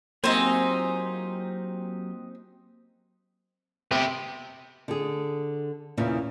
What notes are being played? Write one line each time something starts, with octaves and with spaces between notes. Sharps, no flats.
F#3 A#3 C4 D#4 F4 G4 C5 G#5
C3 B3 G4
D3 G#4
E2 A#2 C#3 E3